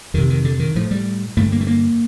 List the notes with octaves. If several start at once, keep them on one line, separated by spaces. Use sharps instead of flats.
F2 C3 D#3
D#3
D3
D#3
A2 F3
G3
G2 D3 A3
A#3
A3
A#3